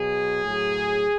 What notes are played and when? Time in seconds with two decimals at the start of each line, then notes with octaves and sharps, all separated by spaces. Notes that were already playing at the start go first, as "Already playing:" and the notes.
Already playing: B2 F#3 G#4
0.43 A2 F#3